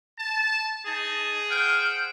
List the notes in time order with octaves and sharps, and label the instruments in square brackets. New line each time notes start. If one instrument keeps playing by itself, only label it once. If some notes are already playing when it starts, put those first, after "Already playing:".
[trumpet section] A5
[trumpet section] D#4 A5 [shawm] G#4
[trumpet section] C5 F#5 G5 [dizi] F6